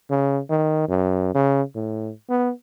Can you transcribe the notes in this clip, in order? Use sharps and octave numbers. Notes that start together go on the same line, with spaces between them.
C#3
D#3
F#2
C#3
A2
B3